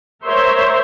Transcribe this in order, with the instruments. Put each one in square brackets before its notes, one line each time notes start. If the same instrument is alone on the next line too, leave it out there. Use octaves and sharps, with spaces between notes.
[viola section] A#4 C5 C#5 E5 C6